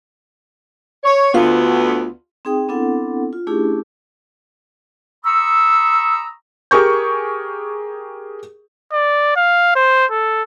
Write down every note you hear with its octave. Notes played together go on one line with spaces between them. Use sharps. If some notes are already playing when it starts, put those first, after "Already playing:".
C#5
D2 B3 F4
C4 D#4 G#4 G5 D#6
B3 C4 D4 E4 A4 F#5
F4
A3 C#4 D4 E4 G4 G#4
A#5 B5 C#6 D#6 E6
G4 G#4 A#4 C#6 G6
D5
F5
C5
A4